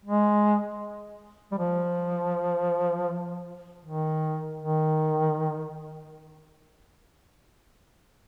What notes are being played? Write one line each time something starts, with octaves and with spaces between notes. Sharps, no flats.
G#3
G3
F3
D#3
D#3